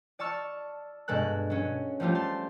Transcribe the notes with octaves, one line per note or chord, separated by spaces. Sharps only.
D5 A5 C#6 E6 F6
G2 B2 G#3 A4 F#6
F#3 C#4
F3 G3 A3 F4 G4
A5 C6